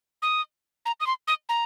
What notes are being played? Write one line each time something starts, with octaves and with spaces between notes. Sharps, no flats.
D#6
A#5
D#6
C6
D#6
A#5